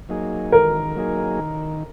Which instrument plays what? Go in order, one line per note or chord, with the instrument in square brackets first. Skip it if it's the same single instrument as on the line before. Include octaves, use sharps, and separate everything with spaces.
[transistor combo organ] F#3 A#3 D#4 G#4
[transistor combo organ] D#3 [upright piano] A#4
[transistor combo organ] F#3 A#3 D#4 G#4
D#3